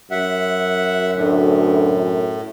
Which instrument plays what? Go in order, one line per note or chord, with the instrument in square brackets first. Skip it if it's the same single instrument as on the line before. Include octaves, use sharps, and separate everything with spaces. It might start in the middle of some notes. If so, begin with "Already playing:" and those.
[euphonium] F#2 [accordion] E5 F#5
[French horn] D2 [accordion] A2